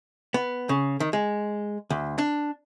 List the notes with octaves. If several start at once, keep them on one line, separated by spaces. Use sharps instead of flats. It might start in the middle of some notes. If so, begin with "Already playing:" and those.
B3
C#3
D#3
G#3
D2
D4